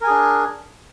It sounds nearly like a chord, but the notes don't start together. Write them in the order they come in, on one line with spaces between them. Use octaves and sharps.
A#4 G#5 G#4 D4